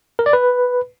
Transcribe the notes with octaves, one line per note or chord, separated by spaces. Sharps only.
A#4
D5
B4